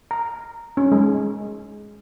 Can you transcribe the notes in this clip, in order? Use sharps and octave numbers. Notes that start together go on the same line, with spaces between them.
A#5
C#4
G#3